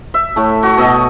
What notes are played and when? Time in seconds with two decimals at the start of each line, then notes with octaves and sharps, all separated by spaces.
0.14 E5
0.36 A2 A3
0.63 F#4 D6
0.77 B2 D#5 E5